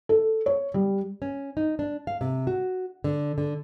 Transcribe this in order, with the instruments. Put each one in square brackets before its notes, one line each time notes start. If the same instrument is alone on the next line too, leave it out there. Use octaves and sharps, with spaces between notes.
[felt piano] A4
C#5
G3
[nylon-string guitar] C#4
D#4
D4
F5
C3
F#4
D3
D3